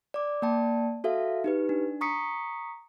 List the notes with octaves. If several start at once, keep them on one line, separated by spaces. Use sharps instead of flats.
D5 D6
A#3 D5 G5 A5
F#4 A4 E5 F5
D#4 G4 B4
D4
A#5 C#6 D#6 B6 C#7